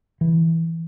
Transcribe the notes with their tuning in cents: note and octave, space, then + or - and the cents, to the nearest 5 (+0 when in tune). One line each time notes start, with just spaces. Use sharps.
E3 -10